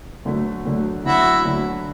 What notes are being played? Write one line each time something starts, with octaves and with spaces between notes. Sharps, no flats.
D2 D3 F#3 A3
D2 D3 F#3 A3
D2 D3 F#3 E4 F#4
D2 D3 F#3